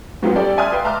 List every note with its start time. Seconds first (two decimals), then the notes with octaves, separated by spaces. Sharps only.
0.22 G#2 F#3 B3 C4 F4
0.35 G3 C#4 A4 D5 G5 A5
0.57 D5 E5 G#5 C6 D#6 F6
0.72 B4 E5 F5 G5 C6
0.84 E5 A5 A#5 C6 D6 F6